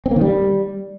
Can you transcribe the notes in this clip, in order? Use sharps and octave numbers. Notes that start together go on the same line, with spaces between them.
C4
A#3
D#3
G3